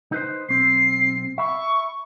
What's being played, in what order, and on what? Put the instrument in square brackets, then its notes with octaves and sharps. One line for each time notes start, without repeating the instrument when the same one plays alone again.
[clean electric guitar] D#4 B4 C5
[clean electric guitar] B1 C4 [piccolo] C7
[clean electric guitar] E5 B5 [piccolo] C#6